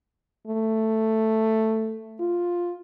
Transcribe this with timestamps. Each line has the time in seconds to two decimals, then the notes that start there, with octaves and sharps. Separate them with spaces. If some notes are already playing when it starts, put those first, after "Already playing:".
0.47 A3
2.20 F4